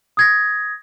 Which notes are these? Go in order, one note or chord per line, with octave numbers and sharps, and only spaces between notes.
D#6 G#6 A#6